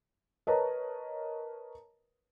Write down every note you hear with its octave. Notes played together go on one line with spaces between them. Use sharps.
A#4 B4 C#5 D#5 A5 A#5